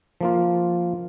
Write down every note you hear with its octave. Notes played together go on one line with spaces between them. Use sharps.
F3 A#3 F4